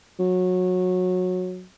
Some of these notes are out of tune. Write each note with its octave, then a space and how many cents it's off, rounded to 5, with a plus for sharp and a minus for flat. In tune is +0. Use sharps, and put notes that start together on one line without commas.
F#3 -20